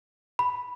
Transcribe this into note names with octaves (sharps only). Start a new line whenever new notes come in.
B5